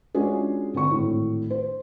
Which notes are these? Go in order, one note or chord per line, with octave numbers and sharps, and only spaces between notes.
G#3 C#4 D4 F4 F#4 G#4
D3 C4 C#6
G#1 A2
C5